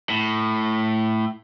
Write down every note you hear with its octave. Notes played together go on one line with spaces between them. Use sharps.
A2